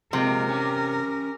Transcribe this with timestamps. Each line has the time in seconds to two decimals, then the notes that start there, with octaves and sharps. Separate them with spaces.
0.13 C3 F3 G#3 A#3 A#4
0.49 C#4 G4